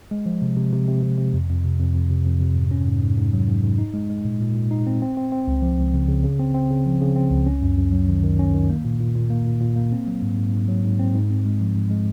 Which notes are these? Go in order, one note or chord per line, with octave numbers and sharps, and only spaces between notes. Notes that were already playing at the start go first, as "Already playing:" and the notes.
G#3
F3
C3
C3
C3
C3
C3
C3
F2
F2
C3
F2
F2
C3
F2
C3
G#2
C#4
G#2
G#2
G#2
F#3
G#2
G#2
D#4
G#3
G#3
A#2
A#2
A#2
D#4
C4
C4
C4
C4
C#2
F3
C#2
C#3
C#3
C#3
C4
C4
C#3
F3
C#3
C4
C#2
C#4
F#2
F#2
F#3
D#3
D#3
C#4
D#3
A#3
A#2
A#2
A#2
A#3
A#2
A#2
A#3
C4
F#3
G#2
G#2
G#2
F#3
G#2
C4
G#2
C4
G#3
F3
G#2
G#3